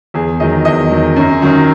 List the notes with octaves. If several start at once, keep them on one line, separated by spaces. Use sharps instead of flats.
E2 G#4
D#3 F#3 D#5
E2 D#5
D#3 F#3
F#2
D#3 F#3 C#4